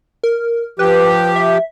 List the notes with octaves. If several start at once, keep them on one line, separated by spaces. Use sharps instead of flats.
A#4
F3 G4 B4
E5